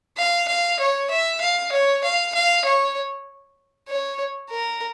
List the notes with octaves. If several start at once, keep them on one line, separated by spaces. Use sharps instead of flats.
F5
F5
C#5
E5
F5
C#5
F5
F5
C#5
C#5
A#4